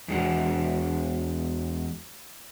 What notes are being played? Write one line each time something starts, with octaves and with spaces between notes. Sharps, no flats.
E2 G#3 F#4